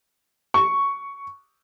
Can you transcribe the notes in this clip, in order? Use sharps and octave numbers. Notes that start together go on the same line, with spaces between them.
C#6